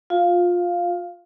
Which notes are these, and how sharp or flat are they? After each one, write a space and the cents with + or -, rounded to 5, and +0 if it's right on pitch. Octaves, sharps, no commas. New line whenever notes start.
F4 +20 F5 +0